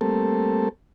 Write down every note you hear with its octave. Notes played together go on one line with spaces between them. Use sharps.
G3 A3 A#3 C4 A4